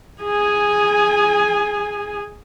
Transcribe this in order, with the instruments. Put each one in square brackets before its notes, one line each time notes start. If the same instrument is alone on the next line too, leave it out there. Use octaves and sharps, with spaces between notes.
[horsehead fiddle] G#4 G#5